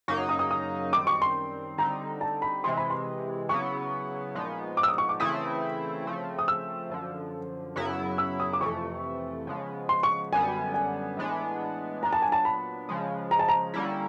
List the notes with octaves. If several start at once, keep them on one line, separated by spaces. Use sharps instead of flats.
F#2 C#3 F#3 A#3 D#4 C#6
D#6
D#6
D#6
F#2 D#3 G3 C4 D6
C#6
C6
D3 G3 C4 D#4 A#5
A5
B5
C3 E3 G#3 C6
B5
C6
C#3 F#3 B3 E4 C#6
A#2 F3 G#3 B3 D#4
D6
E6
D#6
C#6
D6
C#3 E3 A3 C4 E4 D#6
C#3 F3 A3 C4
D#6
E6
F#2 D3 F3
F#2 C#3 F#3 B3 E4
E6
D#6
D6
F2 C3 E3 A3 C#6
C#3 F3 G#3 B3
C6
C#6
F#2 D3 G3 B3 G#5
G#5
A2 E3 G#3 B3 D4
A#2 F#3 B3 D4 A#5
A5
G#5
A5
B5
C#3 F3 G#3
A#5
A5
A#5
D3 G3 A#3 C#4 E4